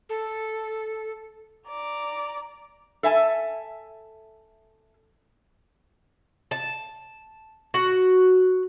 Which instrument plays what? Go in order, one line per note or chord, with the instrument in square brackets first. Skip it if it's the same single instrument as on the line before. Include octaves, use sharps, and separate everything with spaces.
[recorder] A4
[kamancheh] D5 A#5
[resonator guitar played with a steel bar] A4 E5 G#5 A5
[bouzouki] A5
F#4